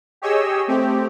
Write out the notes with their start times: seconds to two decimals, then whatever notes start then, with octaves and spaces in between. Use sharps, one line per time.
0.22 G4 G#4 C#5 D#5 E6
0.67 A3 C4 G4